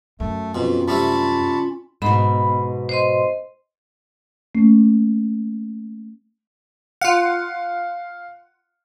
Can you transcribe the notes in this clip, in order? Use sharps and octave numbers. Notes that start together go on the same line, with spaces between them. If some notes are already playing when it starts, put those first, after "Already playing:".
F#2 A3
F2 B2 C#4 F4
C3 G3 A3 A5 B5 C#6
G#2 B2 B3 B5
C5 D#5 C6
A3 A#3 C#4
F4 F5 F#5